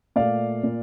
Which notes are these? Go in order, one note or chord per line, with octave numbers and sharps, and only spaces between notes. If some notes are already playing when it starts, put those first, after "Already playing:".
A#2 A3 D5 F5
A#2